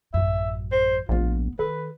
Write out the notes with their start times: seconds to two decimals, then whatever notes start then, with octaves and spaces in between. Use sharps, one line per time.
0.14 A1 F#2 E5
0.72 C5
1.09 D1 A#1 B3 F4
1.59 D#3 A4 B4